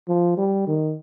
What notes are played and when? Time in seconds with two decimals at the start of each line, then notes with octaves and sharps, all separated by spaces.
0.08 F3
0.38 G3
0.67 D#3